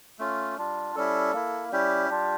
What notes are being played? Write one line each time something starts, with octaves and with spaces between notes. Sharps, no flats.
A3 C#4 F4
G3 D4 F4
G3 C#4 E4 A4
A#3 E4
G3 C#4 E4 G4
G3 D4 F4